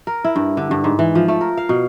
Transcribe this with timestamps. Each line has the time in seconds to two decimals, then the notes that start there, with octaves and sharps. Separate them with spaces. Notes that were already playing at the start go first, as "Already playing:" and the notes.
0.07 A#4
0.24 E4
0.36 G2
0.57 D3
0.71 G2
0.84 G#2
0.99 E3
1.15 F3
1.28 A3
1.41 A#4
1.57 F5
1.69 B2